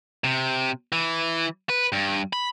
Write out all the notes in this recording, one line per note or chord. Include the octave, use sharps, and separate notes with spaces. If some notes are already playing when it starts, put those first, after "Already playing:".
C3
E3
B4
G2
B5